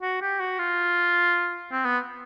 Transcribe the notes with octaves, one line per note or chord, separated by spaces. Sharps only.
F#4
G4
F#4
F4
C4
B3